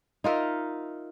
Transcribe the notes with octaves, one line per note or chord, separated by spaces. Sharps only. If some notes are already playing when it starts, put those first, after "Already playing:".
D#4 F4 A#4 E5